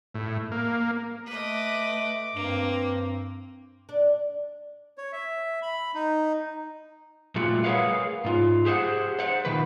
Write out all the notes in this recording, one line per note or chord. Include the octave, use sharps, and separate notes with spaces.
A2
A#3
A3 B4 D#5 D6
G2 A#3 C4
D4
C#5
E5
B5
D#4
A#2 G3 A3 F4 F#4
G#4 A#4 B4 C#5 F5 F#5
G#2 F4
G4 G#4 C5 F5 F#5
C5 F#5
A#2 D#3 B4